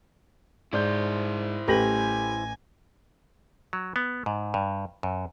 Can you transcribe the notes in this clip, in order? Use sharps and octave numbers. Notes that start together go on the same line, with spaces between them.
G#2 E4 C5 D5 G6
A1 A3 G4 B4 G#5 A#6 F#7
F#3
B3
G#2
G2
F#2